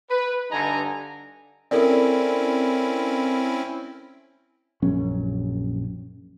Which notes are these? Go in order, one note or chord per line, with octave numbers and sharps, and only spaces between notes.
B4
G2 D3 D#4 G#5 A#5
C4 C#4 E4 A4 A#4 D5
A#1 F#2 C#4